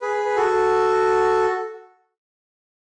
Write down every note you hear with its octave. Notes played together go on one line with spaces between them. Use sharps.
G#4 B4
B4
F#4 A4